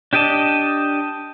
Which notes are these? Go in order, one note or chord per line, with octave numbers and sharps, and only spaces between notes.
D4 G4 D5 D#5 A5